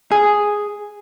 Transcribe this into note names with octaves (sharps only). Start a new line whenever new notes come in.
G#4